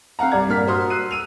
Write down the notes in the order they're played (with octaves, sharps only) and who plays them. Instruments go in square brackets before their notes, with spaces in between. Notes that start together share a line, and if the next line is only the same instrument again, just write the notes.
[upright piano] C4 F5 F#5 A#5
C2 G3 D5 A#5 G#6
G2 A#2 A#4 F6 B6
F#4 A#4 C5 C6 D#6 F6
E6 F#6 C7 D#7
E6 D#7 F7